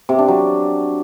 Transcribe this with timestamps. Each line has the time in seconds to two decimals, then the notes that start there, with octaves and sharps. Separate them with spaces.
0.09 C3
0.19 D4
0.28 F#3